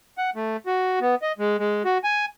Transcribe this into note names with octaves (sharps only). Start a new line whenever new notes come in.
F#5
A3
F#4
B3
D#5
G#3
G#3
F#4
G#5